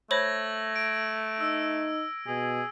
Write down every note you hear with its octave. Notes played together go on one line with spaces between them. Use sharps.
A3 C5 C#5 B5 G#6 A#6 F#7
D7
D#4 E6
B2 G#4